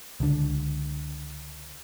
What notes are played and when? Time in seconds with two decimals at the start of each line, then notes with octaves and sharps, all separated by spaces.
0.20 C#2 D3